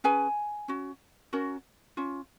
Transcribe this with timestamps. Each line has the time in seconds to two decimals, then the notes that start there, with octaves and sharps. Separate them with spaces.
0.04 C#4 G#4 B4 G#5
0.68 C#4 F#4
1.33 C#4 F#4 A#4
1.97 C#4 F4